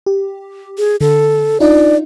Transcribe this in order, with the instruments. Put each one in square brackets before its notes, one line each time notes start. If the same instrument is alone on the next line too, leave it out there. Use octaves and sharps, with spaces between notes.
[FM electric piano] G4
[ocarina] G#4
[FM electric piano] D3 [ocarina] A4
[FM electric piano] D4 D#4 F4 [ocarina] D5